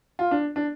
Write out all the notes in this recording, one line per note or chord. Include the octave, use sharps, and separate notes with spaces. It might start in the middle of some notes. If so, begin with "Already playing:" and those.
F4
D4
D4